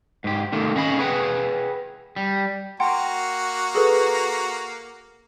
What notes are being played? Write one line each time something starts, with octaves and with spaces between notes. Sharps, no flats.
G#2 G4
D#3 A3 A#3
C#4 D#5 F5 B5
G#4 B4 F#5 G5
G3
A#3 F#4 F#5 G5 A#5 C6
G#4 A4 B4